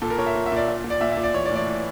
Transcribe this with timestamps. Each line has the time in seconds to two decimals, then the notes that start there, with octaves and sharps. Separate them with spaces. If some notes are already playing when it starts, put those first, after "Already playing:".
0.02 A#2 A4
0.10 A#4
0.18 A#2 C#5
0.26 E5
0.36 A#2
0.46 E5
0.52 A#2 D5
0.68 A#2
0.84 A#2
0.90 D5
1.01 A#2 E5
1.12 E5
1.17 A#2
1.24 D5
1.34 E3 C#5
1.46 D5
1.51 A2
1.56 D5
1.67 E3